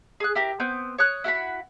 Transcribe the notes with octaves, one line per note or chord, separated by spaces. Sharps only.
G#4 D#6 F#6
E4 G4 A#4
B3 C4 G6
C#5 D#6 F#6
E4 F#4 F#5 B5